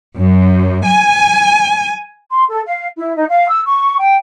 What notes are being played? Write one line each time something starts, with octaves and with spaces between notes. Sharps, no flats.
F#2
G#5
C6
A4
F5
E4
D#4
F5
E6
C#6
G5